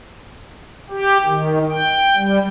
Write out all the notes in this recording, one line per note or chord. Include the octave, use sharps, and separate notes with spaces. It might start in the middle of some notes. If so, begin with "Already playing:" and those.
G4
D#3
G5
G3